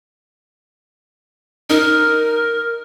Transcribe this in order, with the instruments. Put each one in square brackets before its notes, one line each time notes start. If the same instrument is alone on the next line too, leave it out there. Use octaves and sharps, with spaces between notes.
[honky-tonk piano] D#4 [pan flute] A#4